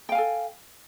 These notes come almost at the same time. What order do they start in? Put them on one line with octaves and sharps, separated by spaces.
G5 F5 G#5 A4